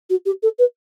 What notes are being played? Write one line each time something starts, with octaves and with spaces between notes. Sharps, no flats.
F#4
G4
A4
B4